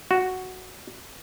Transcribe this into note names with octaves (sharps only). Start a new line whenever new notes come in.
F#4